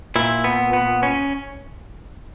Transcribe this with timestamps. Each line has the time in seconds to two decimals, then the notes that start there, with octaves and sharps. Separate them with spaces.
0.16 A#2 E4
0.44 B3
0.73 B3
1.03 C#4